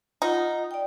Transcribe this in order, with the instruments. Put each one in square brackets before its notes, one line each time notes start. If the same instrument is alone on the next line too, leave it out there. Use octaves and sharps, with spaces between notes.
[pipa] D#4 [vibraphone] F4 F#5
[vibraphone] D5 G5